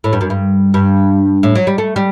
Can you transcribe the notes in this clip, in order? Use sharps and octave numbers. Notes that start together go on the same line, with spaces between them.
A2
G2
F#2
G2
G2
A2
F#3
G3
A3
G3